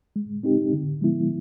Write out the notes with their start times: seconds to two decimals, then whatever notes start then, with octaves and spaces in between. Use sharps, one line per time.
0.16 G#3
0.43 C4 D#4 G4
0.73 D3
1.01 F3 G#3 B3 E4